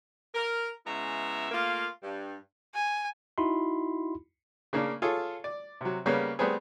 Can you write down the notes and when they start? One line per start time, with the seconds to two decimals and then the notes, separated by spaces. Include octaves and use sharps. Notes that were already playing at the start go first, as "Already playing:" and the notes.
0.35 A#4
0.86 C#3 G#3 B3 E4 E5 A#5
1.51 A3 A#3 F4
2.03 G2
2.74 G#5
3.38 D#4 E4 F#4 B5 C6
4.73 C#3 A#3 D4
5.02 F4 G#4 A4 C#5
5.44 D5
5.81 C3 F#3
6.06 C#3 G3 A#3 B3 C#4
6.39 G3 A3 B3 C4 G#4